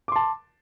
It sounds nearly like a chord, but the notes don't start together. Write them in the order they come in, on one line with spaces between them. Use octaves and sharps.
D6 C6 A5